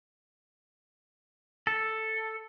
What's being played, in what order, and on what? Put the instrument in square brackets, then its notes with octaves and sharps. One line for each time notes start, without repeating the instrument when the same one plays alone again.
[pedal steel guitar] A4